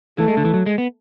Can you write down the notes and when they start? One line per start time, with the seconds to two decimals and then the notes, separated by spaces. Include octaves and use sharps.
0.18 E3 A3
0.28 G#3
0.37 D3
0.45 E3
0.54 F#3
0.66 G#3
0.78 B3